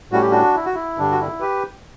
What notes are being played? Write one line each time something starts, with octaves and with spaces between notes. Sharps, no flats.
A2 G3 C#4 F#4
G4
D4 F#4
E4
F#4
E4
G2 D3 G3 D4
F#4
E4
G4 B4